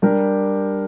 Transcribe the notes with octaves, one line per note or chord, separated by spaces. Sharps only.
G3 D4 G4 A#4